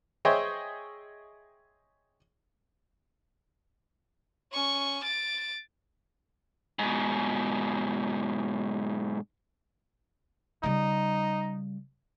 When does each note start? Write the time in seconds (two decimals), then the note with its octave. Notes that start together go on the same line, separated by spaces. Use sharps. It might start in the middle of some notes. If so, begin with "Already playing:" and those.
0.25 G#4 C5 C#5 D#5 E5 G5
4.52 C#4 C#6
5.04 A6 D7
6.79 G#2 B2
10.63 C#3 G3 D#4